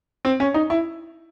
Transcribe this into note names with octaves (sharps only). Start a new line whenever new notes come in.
C4
C#4
D#4
E4